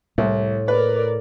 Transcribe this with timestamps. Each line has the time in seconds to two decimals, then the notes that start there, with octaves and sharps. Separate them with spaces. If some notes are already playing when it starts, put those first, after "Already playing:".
0.18 C2 A2
0.68 A#4 B4 D5